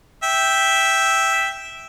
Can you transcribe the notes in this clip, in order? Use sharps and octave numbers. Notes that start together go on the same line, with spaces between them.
E5 G5